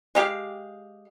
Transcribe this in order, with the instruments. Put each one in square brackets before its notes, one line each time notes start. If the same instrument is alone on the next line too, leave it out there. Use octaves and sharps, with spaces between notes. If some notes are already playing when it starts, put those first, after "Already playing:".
[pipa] G#3 G4 F5